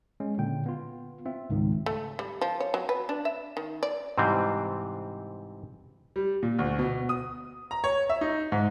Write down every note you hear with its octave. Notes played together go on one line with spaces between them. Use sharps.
G#3 C#4
A#2 D3 G5
B3 F4
C4 F4 E5
C#2 G#2 D#3
A3
G3
F3
C#5
F#3
B4
D4
E5
D#3
D5
G#2 C3 E3 G3 C4
G3
A#2
D2
B2
D#6
A#5
C#5
E5
D#4
G#2